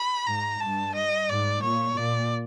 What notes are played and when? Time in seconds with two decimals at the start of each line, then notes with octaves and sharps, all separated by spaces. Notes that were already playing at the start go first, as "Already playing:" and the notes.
Already playing: B5
0.26 G#2 A#5
0.60 G2 A5
0.95 D#5
1.29 G#2 D5
1.63 A#2 C#5
1.97 A#2 D5